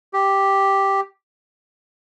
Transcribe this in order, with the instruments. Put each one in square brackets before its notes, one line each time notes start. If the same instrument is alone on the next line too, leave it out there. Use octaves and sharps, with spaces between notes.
[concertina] G4